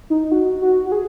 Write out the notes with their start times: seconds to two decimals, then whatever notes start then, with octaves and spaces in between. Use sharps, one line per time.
0.10 D#4
0.32 F#4
0.62 F#4
0.86 F#4
0.92 G#4